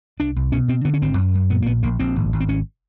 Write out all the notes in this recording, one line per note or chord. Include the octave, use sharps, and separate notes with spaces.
C2 D4
C2
B2 C#4
B2 C4
D3 B3
C#4
G#1 C4
F#2
F#2
A#2 B3
A#3
A#1 B3
A#1 A#3
A#1 C4
G#1
G#1
C4
G#1 C#4